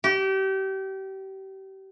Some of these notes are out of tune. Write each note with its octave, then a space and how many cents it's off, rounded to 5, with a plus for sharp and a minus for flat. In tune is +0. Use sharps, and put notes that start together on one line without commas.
G4 -30